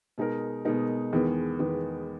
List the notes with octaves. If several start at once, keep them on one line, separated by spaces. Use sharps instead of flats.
B2 G#3 D#4 A#4
B2 G#3 D#4 A#4
E2 D#3 G#3 B3
E2 D#3 G#3 B3